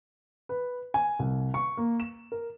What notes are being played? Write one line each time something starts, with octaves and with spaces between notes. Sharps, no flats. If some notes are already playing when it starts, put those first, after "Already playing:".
B4
G#5
C2
C#6
A#3
E7
A#4